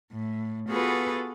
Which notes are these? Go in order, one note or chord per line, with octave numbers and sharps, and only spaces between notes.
A2
B3 F4 F#4 G#4 A4 B4